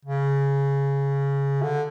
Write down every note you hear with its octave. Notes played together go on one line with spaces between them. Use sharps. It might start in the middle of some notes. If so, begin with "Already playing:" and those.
C#3
D3